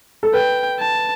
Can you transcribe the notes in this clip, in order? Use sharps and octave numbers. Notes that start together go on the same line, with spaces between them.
A4
B4 G5
A5